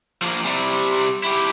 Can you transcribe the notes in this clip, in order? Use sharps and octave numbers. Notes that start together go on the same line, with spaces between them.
F3 A#3
C3 G3
E4 G4